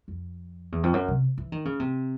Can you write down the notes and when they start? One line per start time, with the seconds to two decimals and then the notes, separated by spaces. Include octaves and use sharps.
0.08 F2
0.72 E2
0.83 F2
0.93 F#2
1.08 C3
1.38 E3
1.52 D#3
1.65 C#3
1.80 C3